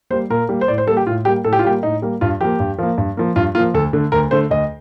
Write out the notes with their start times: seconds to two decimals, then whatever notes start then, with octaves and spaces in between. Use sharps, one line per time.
0.10 G3 A#3 C5
0.30 A#2 A#4
0.49 G3 A#3
0.61 C5
0.68 A2 D5
0.78 C5
0.87 G3 A#3 A4
0.97 G4
1.06 A2 F4
1.25 G3 A#3 G4
1.44 A2 A4
1.53 G4
1.59 F4
1.64 G3 A#3 G4
1.83 A2 D#4
2.02 G3 A#3
2.21 G2 F4
2.41 F3 A#3 G4
2.60 G2
2.79 F3 A#3
2.98 G2
3.17 F3 A#3
3.36 G2 F4
3.55 F3 A#3 F4
3.74 D2 A4
3.93 D3 A3
4.12 D2 A#4
4.31 D3 A3 C5
4.50 D2 D#5